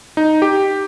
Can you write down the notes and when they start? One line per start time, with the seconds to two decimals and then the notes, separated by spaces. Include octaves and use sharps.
0.17 D#4
0.42 G4